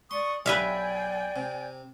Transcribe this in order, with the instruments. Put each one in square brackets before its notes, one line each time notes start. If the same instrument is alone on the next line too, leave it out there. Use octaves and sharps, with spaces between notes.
[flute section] D5 C#6 D#6 [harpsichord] C6
[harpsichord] B1 [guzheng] B4 E5 F5 [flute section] D5 G5 G#5
[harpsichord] C3